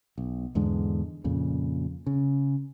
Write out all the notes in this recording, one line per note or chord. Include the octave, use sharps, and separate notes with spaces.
B1
E2 G#2 D3 G#3
F2 A#2 C#3
C#3